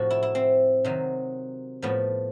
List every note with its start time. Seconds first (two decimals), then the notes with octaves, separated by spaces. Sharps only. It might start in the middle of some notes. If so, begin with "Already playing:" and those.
Already playing: A2 C3 F3 F#4
0.10 E4
0.23 E4
0.35 C4
0.85 C3 D#3 F#3
1.82 A2 F3 B3